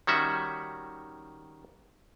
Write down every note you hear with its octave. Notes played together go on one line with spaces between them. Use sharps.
D#3 G3 C#4 F#4 E5